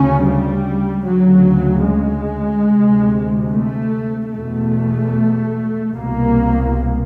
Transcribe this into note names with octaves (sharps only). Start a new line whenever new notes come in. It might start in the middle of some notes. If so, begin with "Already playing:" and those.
Already playing: D2 C#3 C#4
G3
D2 C#3 F#3
G#3
D2 C3
A3
E2 B2 A3
C2 B2 A#3